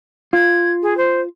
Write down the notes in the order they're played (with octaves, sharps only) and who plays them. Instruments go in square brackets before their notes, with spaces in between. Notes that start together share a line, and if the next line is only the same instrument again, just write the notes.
[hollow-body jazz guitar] F4 [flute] G#6
[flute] G#4
C5